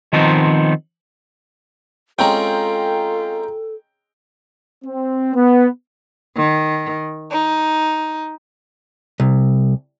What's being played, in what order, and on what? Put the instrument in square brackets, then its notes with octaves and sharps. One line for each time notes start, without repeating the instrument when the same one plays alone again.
[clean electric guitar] D#3 F3 B3 C4 D#4
[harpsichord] G#3 C4 C#4 [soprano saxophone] F4 [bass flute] A4 [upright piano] G5 A#5
[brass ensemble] C4
B3
[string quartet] D#3
D#4
[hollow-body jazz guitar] C2